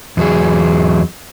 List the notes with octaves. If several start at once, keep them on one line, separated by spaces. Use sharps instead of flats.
E2 F#3 G#4